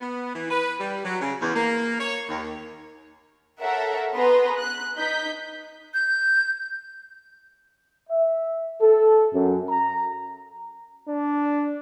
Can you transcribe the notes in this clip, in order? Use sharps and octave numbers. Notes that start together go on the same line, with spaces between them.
B3
E3
B4
G3
F#3
C#3
E2
A#3
C#5
D#2
A4 A#4 C#5 E5 F#5
B3 G#4 B4 A#5 C6
F#6
D#4 G6 B6
G6
E5
A4
F#2
A#5
D4